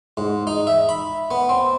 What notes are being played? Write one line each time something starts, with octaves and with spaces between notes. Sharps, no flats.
G#2
D#4
E5
B5
B3
C4